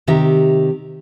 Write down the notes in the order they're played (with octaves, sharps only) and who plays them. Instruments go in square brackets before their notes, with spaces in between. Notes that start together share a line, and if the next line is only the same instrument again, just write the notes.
[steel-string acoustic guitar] C3 D#3 G4 E5 A#5